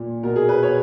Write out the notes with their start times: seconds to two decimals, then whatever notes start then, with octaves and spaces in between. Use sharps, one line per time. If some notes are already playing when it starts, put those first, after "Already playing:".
Already playing: A#2
0.23 B2 A#4
0.36 G#4
0.49 B4
0.63 C#5